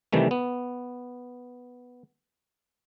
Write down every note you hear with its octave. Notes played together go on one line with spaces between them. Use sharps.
C3 D#3 E3 G3 A3
B3